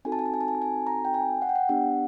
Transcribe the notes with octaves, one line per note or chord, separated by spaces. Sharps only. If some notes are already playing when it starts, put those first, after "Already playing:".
C4 D#4 F#4 A4 G#5
A5
G#5
A5
G#5
A5
G#5
A5
G#5
A#5
G5
G#5
F#5
G5
F#5
B3 D4 G4 F#5